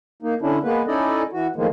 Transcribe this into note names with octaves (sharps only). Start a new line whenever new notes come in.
A#3 D#4
D3 C#4 D4 E4
G#3 A#3 B3 B4
C#4 D#4 E4 A4 D5 D#5
E3 F#4
A2 D#3 F3 G#3 A#3